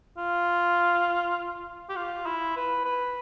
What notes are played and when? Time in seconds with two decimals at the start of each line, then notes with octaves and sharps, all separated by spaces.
0.17 F4
1.89 G4
1.96 F4
2.26 E4
2.56 B4
2.85 B4